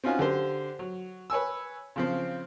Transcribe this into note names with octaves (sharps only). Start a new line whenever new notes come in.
C4 C#4 D#4 F4 F#4 G#5
D3 G4 C5
F#3
B4 C#5 G#5 E6
C#3 F3 C4